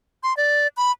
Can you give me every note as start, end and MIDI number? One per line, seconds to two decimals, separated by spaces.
0.23 0.36 84
0.37 0.67 74
0.77 0.92 83